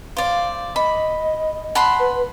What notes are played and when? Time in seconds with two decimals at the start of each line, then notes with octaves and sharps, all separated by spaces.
0.17 C5 D5 F5
0.76 D#5 B5
1.75 F#5 A5 B5 C6
1.99 B4